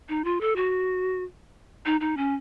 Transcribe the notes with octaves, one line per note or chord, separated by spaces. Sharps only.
D#4
F4
A4
F#4
D#4
D#4
C#4